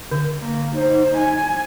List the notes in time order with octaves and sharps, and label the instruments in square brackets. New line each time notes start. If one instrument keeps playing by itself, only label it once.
[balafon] D3
[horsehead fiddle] A#3
D#4 C5
G#5